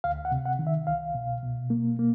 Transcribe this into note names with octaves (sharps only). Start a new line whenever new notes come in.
D2 F5
F#5
C3
F#5
D#3
E5
C2 F5
B2
B2
A#3
A#3